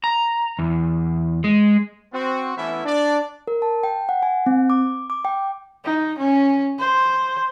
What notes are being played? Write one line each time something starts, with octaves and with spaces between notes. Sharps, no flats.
A#5
E2
G#3
C4 F#4
E3 A3 B3 C#4 E4 E5
D4 D5
A#4
A5
G5
F#5
G#5
C4
D6
D6
G5
D#4
C#4
C5